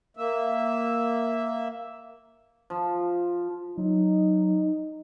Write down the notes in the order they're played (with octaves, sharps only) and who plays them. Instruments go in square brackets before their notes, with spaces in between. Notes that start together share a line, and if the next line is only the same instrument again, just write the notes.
[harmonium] A#3 E5
[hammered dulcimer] F3
[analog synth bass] F#3 [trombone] D#4